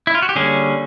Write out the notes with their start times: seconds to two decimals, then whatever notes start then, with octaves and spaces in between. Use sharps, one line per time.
0.07 E4
0.15 F4
0.22 F#4
0.29 G4
0.35 D3 G3 A#3 C#4 G#4